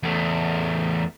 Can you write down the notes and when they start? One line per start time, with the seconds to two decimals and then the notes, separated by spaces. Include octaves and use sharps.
0.03 E2 A3